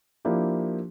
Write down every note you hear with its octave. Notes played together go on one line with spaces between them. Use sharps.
F3 A#3 D4 E4 G4